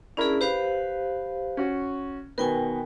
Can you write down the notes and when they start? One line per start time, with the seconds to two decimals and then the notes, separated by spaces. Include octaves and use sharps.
0.17 C#4 D4 E4 G#4 A#4
0.41 G4 B4 C5 F5
1.57 C#4 F#4
2.38 B2 D#3 B3 A#4 G5 G#5